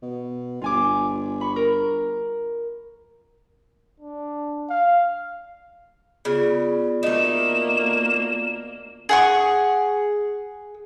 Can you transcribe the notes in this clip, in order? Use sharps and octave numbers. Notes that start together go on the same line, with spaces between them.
B2
G1 F4 G#5 D6
B5 C#6
A#4
D4
F5
C#3 B3 F4 D5
D2 A3 A#3 D#4 E7
G#4 F#5 C#6